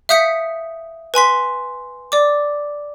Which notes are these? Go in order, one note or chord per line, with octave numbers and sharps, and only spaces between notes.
E5 F5 D#6 G6 B6 C#7
B4 G#5 C6 B6
D5 D6